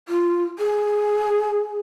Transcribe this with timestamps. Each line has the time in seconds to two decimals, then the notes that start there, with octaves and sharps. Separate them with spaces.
0.08 F4
0.59 G#4